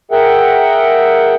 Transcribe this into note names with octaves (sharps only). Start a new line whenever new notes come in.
G#4 A#4 E5 F#5 G5